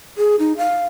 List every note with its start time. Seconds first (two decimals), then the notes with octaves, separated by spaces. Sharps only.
0.17 G#4
0.39 D#4
0.57 F5